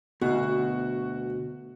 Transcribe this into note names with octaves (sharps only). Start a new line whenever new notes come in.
D2 B2 F#4